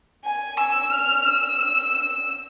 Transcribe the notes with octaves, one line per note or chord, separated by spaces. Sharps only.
G#5
E6
F6
E6